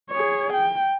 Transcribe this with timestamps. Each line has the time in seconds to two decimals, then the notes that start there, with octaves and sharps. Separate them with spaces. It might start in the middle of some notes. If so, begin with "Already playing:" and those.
0.10 G#4 C#5
0.53 G5